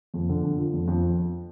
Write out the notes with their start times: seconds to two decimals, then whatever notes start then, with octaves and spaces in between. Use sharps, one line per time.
0.14 F2
0.29 D3
0.44 D3
0.58 F3
0.73 F2
0.87 F2